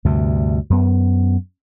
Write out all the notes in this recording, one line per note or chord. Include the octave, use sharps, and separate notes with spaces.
D2 G2 C3
F#2 B3